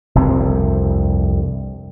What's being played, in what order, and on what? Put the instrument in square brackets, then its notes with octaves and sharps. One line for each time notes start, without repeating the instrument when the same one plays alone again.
[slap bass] F1 C2 G2 C4